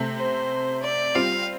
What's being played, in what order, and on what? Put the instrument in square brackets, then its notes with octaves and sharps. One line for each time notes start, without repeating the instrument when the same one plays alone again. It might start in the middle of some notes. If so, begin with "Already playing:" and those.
Already playing: [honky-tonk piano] C3 A3 C4
[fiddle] C5
D5
[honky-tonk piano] G3 C4 F4 [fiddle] F5